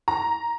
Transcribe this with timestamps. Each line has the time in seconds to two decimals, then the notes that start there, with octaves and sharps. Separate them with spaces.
0.08 A#5